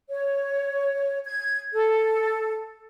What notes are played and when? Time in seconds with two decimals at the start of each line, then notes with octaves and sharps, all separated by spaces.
0.09 C#5
1.25 G#6
1.73 A4